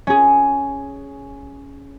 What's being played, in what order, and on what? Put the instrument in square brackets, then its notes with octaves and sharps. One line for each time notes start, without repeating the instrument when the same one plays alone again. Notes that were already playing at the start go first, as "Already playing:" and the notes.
[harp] C#4 G#4